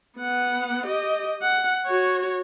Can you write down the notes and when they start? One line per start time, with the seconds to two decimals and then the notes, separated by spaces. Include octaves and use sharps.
0.18 B3 F#5
0.86 G4 D#5
1.42 F#5
1.86 F#4 C#5